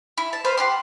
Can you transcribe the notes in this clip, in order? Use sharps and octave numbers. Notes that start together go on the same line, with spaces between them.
E4
A5
B4 C5 F5 B5
G4 F#5 C6